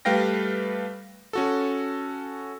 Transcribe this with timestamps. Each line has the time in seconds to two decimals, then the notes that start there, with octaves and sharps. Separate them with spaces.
0.05 G3 A3 B4 F5 G5 A#6
1.33 C#4 F#4 A4